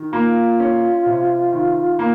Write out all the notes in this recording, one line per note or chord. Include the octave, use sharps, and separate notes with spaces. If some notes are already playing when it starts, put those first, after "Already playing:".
Already playing: D#3
A#3 F4
C#4
C3
D#3
A#3